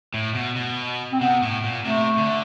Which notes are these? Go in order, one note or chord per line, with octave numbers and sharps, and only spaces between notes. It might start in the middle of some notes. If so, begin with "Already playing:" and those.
A2
B2
B2
C4
C3 B3
A2
A#2
C3 A3
D3